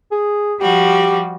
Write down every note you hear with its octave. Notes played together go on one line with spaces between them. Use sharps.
G#4
F3 G3 F#4 G4